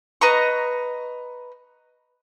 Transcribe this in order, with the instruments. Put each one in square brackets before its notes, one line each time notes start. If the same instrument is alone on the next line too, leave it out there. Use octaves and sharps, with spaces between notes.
[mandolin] B4 D#5 A#5 C#6